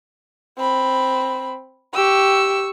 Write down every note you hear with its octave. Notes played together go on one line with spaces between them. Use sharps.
C4 B5
G4 C#6 E6